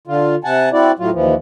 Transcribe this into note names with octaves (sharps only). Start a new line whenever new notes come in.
D3 F4
C3 F#5 G#5 A5
C4 E4 F#4 D5
A2 F#3 F4
D#2 E3 F3